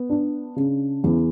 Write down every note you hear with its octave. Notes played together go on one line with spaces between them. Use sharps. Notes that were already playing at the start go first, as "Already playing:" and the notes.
Already playing: B3
D4
C#3
E2